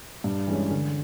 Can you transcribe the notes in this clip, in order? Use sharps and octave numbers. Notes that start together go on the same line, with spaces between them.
G2
E3 G#3 C#4
D3